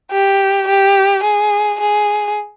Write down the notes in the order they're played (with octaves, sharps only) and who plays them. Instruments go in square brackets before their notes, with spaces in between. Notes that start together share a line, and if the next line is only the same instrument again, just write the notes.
[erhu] G4
G4
G#4
G#4